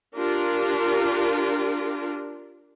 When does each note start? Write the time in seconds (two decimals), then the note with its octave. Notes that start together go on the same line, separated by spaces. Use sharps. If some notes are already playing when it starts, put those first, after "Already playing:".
0.15 D4 F4 G4 A#4